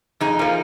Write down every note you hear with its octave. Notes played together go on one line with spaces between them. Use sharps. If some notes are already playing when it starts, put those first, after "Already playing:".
F2 D#4 G#4
F3 A#3